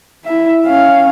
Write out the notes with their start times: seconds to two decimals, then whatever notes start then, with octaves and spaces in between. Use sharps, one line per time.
0.24 E4 E5
0.66 C#4 F5